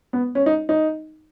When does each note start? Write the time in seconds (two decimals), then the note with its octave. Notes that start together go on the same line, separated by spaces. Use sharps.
0.13 B3
0.35 C#4
0.46 D#4
0.69 D#4